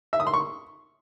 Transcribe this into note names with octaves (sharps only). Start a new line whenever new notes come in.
E5
D#6
C6
C#6